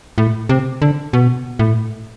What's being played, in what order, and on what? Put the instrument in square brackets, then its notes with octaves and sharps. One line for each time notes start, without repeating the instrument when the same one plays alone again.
[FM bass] A2
C3
D3
B2
A2